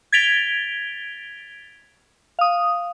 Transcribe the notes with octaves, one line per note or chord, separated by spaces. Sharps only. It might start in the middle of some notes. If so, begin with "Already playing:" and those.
G#6 A6 B6 D7 F7 G7
F5 D#6